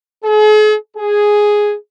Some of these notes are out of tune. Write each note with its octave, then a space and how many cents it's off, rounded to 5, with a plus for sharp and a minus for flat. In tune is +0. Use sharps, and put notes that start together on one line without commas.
G#4 +45
G#4 +0